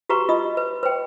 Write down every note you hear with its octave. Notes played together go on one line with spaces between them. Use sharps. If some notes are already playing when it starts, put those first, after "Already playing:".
F#4 G4 B4 A#5 C#6
F4 D#5 D#6
B4
B4 C5 G5